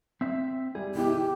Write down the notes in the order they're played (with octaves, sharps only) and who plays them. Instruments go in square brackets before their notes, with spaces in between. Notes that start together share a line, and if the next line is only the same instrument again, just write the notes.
[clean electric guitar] C4 E5 [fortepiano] E6
[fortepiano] G3 [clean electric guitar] G#4
[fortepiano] B2 E3 E4 [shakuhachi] G4